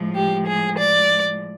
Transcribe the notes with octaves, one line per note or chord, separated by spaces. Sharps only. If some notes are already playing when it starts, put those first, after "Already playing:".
Already playing: A2 F3 G#3
G4
G#4
D5